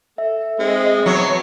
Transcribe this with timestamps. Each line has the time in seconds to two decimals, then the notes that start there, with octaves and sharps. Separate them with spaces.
0.18 A4 E5
0.60 G#3 C4 D#5
1.06 B2 F#3 C#5